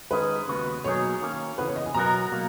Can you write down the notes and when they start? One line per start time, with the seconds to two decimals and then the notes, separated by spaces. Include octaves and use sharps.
0.11 D#3 G#3 C#4 B4
0.48 D#2 C#3 G#3 B3 F#4
0.84 B2 F#3 A#3 D#4 G#4 C#5
1.22 D#3 A#3 C#4
1.58 C#3 E3 B3 B4
1.67 C#5
1.76 D#5
1.86 G#5
1.94 B2 F#3 B3 F#4 A#4 A#5
2.32 B2 F#3 A#3